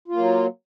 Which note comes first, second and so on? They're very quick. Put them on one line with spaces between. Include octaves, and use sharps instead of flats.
F4 A#3 F#3